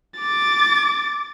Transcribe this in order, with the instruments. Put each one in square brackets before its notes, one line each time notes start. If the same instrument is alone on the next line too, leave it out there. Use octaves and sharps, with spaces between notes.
[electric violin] D6 A6